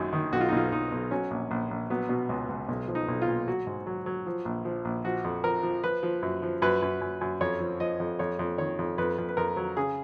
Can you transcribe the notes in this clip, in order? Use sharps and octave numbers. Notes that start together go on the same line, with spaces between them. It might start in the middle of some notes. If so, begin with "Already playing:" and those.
Already playing: G#1 F#2 D#3
D#3
B1 F#4
F4
D#4
B1 F4
B1 D#4
B1
F#3 C#4
A#1
A#1
A#1
F#3 B3
B2
C#2
C#2
B1
F3
D#4
B1
F4
A#2
F#3 F#4
G#2
F#3
F#3
F3
A#1
F3
A#1
F3 F#4
F2
F3 A#4
F3
F3 B4
F3
F#2
F3
F#2 B4
F#2
F#2
F#2
F2 C#5
F3
F3 D#5
F2
F2 C#5
F2
D#3 C#5
F2
F2 B4
F2
B4
F2 A#4
F#3
C#3 G#4